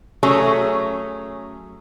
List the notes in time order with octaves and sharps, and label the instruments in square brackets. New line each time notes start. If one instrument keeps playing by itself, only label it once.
[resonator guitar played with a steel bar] F#3 A3 C#4 G#4